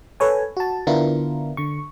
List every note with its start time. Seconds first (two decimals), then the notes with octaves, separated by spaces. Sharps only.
0.20 A4 B4 C#5 G#5
0.57 F#4 A5
0.87 D3 B3 D4 E4 F4 A#4
1.57 D3 C#6